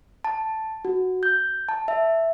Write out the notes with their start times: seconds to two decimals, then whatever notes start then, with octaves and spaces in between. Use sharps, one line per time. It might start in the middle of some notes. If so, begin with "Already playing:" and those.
0.24 A5
0.85 F#4
1.23 G6
1.69 A5
1.88 E5